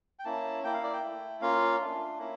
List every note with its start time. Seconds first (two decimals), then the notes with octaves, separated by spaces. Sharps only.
0.19 G5
0.25 A#3 C#4 E4 A5
0.63 A#3 E4 G5
0.74 F5
0.84 D5
0.93 G5
1.03 A3 E4
1.41 A#3 C#4 F4 F5
1.80 A3 D4 F4
2.18 A#3 C#4 E4